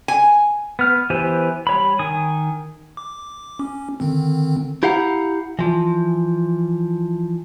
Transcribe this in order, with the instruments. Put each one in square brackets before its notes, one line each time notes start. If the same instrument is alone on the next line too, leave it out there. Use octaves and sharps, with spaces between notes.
[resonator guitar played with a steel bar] G#5
[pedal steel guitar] B3 F6
E3 B3 G4 C5 G#5
G3 C#5 B5
D#3 G#5 D#6
[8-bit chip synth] D6
C#4
D3 D#3 C4
[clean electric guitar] E4 G4 F5 F#5 A#5
E3 F3